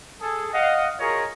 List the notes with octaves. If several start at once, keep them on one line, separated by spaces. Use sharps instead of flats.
G#4 A4
D#5 F5 F#5
F4 F#4 G#4 A#4 C#5 D#5